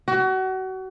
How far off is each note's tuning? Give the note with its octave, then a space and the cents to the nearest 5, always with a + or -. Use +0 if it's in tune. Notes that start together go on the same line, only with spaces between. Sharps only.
F#4 +30